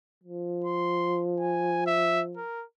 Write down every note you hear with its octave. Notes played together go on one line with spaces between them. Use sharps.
F3
C6
G#5
E5
A#4